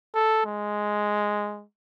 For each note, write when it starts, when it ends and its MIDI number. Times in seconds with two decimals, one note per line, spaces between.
0.14 0.41 69
0.46 1.64 56